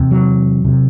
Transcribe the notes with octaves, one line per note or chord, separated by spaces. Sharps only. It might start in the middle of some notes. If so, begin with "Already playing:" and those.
Already playing: E2 C3
F#3
C3